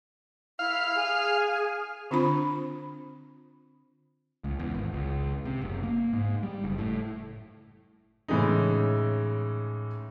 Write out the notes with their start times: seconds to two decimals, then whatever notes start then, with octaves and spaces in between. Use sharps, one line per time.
0.59 E4 F5
0.95 G#4
2.11 D3 C4 D4 F4 C5 B5
4.44 C#2
4.60 E2
4.74 G#1
4.93 C#2
5.45 C3
5.62 F#1
5.83 A#3
6.13 G#2
6.43 G3
6.64 F#1
6.78 A2
8.28 A2 C#3 E3 G#3 D#4